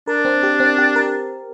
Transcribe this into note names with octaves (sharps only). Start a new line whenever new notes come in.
D4 A#4
C4
G4
C4
G4
A#4